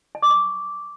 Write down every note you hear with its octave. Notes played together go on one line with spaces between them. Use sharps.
A5
D6
C#6